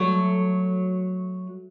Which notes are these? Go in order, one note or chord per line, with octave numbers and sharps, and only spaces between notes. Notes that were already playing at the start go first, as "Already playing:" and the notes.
Already playing: F#3 A3